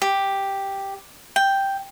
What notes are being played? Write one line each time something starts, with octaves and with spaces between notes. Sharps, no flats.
G4
G5